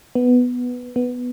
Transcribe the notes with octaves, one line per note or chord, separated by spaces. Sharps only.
B3
B3